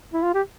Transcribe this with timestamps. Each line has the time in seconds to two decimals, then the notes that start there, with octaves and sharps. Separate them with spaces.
0.13 E4
0.23 F4
0.34 G4